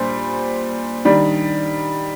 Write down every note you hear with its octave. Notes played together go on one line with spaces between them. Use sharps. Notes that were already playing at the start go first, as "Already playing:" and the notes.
Already playing: A#2 G3 D4 C5
D#3 G3 D4